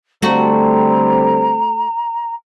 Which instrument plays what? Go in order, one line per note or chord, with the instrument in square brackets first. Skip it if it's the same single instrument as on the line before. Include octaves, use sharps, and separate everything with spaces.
[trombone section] D3 G3 C4 [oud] A3 F#4 [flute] A#5